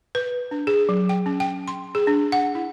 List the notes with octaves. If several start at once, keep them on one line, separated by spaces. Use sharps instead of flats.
B4
D4
G#4
F#3
G5
C#4
G5
C6
G#4
D4
F#5
E4